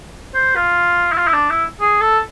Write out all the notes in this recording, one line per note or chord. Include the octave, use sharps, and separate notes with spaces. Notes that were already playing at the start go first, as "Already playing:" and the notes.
C5
F4
E4
F4
E4
D4
E4
G#4
A4